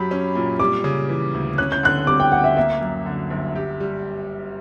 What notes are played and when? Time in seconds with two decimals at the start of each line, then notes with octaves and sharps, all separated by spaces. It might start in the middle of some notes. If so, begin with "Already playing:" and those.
Already playing: F#2 F#3 G4 B5
0.11 C#4
0.35 A#2
0.59 G3 D6
0.84 C#3
1.09 E3
1.34 D2
1.58 C#4 F#6
1.72 G6
1.83 D3 F#6
2.07 G3 D6
2.20 G5
2.32 D2 F#5
2.44 E5
2.57 A#3 E5
2.81 F#2
3.06 D3
3.30 G1
3.55 G4
3.80 G3